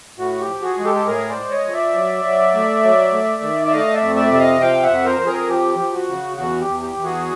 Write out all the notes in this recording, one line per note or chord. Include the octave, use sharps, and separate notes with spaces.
A2 F#4
G4
F3
F#4 G#4
G#3
G4 A4
A4
A2 G#4 A#4
C5 D5
G#3
C#5 D#5
F3
D5 E5
F#3
F#3
A3
F#3
A3
D#3
E5
A3 D#5 F5
D5 E5
F2
D5 E5
C3 E5
D#5 F5
F3 F5 G5
E5 F#5
F2
A#4 C5
F2
G#4 A#4
F3 G4
F3
F#4
C#3
E2 F#4
G4
E2
G4
E2
F#4 G#4